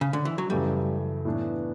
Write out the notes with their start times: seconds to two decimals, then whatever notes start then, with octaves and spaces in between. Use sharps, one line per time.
0.01 C#3
0.13 D3
0.25 E3
0.38 F#3
0.50 F#2 C#3 E3 G3 A3
1.25 A2 E3 B3 D4